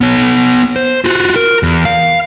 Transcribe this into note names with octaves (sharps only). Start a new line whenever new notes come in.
B3 C#5
C5
F4 F#4
A#4
E2
F5